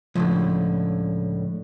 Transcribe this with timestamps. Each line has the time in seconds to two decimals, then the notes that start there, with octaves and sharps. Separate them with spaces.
0.15 C#2 A2 D3 F3